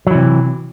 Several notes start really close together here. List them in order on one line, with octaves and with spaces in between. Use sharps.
F#3 E3 C3